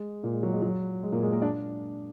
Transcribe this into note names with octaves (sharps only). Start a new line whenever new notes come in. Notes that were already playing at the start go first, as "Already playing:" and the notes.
Already playing: G#3
A#2 A#3
G#3
F#3
G#3
F#3
G#3
A#2 A#3
G#3 G#4
A#3 A#4
D4 D5